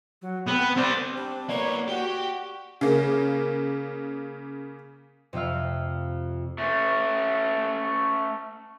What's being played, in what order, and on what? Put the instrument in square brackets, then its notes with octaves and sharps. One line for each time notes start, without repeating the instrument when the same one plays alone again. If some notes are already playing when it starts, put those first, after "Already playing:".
[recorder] F#3
[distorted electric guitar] B3 [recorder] C4
[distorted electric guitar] C4 D5 [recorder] C5
[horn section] G3 C4 D4
[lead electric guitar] A#3 B3 [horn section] E4 C#5 [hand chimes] D5
[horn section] F#4 [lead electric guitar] G4 G5
[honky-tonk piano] C#3 A#3
[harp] F2 C3 F4 E5 F6
[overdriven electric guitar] A3 C#4